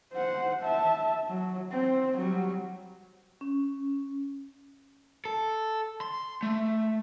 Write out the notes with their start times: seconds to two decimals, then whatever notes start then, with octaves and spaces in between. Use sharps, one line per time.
0.14 C5 F#5
0.63 E5 A5
1.29 F#3
1.72 C4
2.18 F#3 G3
3.41 C#4
5.25 A4
6.01 C6
6.43 A3